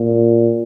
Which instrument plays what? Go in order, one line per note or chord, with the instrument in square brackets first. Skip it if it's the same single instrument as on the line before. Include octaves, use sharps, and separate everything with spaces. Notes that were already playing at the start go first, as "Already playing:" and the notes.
Already playing: [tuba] A#2